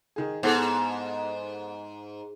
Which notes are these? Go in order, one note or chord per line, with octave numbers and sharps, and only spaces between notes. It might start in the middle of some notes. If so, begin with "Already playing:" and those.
D#3 G#4
G#2 B3 G#4 A4